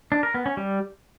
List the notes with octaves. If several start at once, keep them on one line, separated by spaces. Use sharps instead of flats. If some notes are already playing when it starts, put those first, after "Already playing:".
D4
A#4
B3
C#4
G3